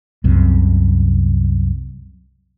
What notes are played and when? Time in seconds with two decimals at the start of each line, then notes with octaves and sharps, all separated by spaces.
0.24 C2 F#2 C3